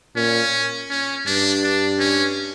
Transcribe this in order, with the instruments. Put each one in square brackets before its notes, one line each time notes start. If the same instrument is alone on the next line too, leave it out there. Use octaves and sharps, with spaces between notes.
[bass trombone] A#2 [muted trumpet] C#4
[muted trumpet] C#4
[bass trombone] G2 [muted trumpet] D4
[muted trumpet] D4
C#4